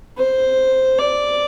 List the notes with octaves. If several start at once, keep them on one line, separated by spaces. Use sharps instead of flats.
C5
D5